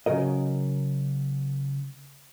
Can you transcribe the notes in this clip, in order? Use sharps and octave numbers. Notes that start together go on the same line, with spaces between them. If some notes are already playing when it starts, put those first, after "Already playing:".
C#3 E3 F#3 A#4 D#5